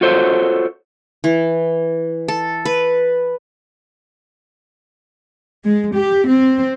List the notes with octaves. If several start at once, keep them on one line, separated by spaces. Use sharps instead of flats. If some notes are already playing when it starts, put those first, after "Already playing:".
F4 F#4 A4 C5 C#5
E3
A4
B4
G#3
G4
C4